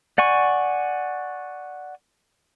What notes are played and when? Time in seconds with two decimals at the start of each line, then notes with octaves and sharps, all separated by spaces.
0.18 D5 F#5 G#5 C#6